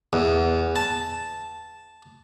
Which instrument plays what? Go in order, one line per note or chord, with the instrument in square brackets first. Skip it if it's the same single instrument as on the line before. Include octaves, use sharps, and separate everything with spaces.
[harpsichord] E2
A5